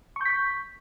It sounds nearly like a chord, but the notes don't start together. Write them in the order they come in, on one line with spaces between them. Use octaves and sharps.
C#6 G6 B6